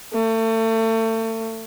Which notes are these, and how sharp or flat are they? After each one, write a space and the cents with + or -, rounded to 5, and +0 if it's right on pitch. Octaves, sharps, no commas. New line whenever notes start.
A3 +30